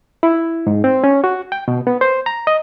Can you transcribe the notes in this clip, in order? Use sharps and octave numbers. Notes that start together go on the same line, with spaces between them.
E4
G#2
C4
C#4
F#4
G5
B2
B3
C5
A#5
D#5